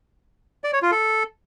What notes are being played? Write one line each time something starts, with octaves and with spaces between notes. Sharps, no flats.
D5
C#5
F4
A4